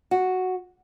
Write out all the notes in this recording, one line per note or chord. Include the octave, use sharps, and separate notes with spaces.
F#4